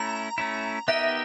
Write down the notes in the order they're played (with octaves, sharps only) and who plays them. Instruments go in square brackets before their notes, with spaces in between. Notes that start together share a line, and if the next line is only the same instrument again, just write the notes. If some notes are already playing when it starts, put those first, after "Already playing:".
Already playing: [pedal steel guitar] A3 C#4 E4 [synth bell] A#5
[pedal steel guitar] A3 C#4 E4
[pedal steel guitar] B3 D#4 G4 A#4 D#5 [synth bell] E5